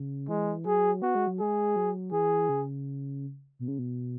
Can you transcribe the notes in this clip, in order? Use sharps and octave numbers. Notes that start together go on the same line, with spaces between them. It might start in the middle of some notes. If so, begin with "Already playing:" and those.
Already playing: C#3
E3 G#3
F#3 G#4
B3 F#4
G#3
F#3
G#3 G#4
F#3
E3 G#4
C#3
B2
C#3
B2